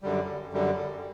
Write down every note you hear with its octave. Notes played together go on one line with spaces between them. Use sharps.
F#2 D3 G3
F#2 D3 G3